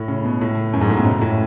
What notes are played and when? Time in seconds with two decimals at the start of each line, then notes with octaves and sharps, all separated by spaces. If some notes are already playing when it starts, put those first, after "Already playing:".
Already playing: A2
0.08 C#3
0.25 B2
0.41 A2
0.73 F#2
0.81 G#2
0.90 A2
0.97 B2
1.05 C#3
1.21 A2